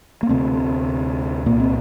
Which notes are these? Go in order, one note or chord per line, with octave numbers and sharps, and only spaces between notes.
A#3
D2 C3 A3 C4
C2 A#2 A#3
C4